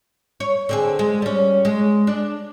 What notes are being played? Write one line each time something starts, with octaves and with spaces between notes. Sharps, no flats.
C#5
D3 C4 G#4
G#3
G3 C#4
G#3
D4